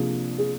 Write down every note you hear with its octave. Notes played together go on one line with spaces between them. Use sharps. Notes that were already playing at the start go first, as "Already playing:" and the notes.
Already playing: C3 F3 A#3 D4 G#4
G#4